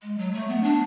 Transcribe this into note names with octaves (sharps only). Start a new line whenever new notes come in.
G#3
F#3
A3
B3
D4